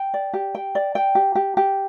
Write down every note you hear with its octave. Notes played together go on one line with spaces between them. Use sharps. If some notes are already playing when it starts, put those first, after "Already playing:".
Already playing: G5
D5
G4
G5
D5
G5
G4
G4
G4